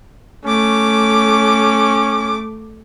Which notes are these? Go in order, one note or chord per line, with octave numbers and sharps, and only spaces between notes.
A3 C#4 D6